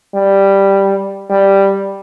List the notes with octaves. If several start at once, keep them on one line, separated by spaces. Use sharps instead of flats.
G3
G3